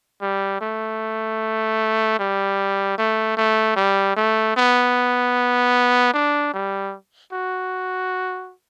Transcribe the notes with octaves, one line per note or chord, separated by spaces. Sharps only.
G3
A3
G3
A3
A3
G3
A3
B3
D4
G3
F#4